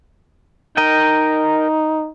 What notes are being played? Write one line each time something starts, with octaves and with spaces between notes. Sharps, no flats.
D#4 A#4 D#5 G5